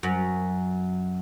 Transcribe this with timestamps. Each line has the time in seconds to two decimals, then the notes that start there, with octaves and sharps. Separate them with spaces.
0.03 F#2